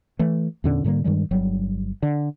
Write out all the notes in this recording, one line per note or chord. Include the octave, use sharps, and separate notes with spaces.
E3 A3
E2 A#2 D3 C#4
G#2 D3 G3 A#3
G2 D#3 G3 G#3
G1 F#3 G3
D3